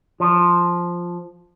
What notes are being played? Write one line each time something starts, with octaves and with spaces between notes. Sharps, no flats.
F3